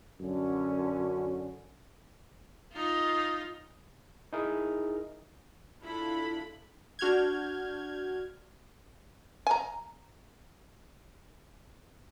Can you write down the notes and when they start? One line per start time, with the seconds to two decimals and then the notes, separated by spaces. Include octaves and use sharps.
0.20 F#2 D3 C#4
2.73 D#4 F4
4.33 D#4 E4 G#4 A#4
5.82 D4 E4 F4 A4 B5
6.99 D4 F#4 F6 G6 G#6
9.47 G#5 A#5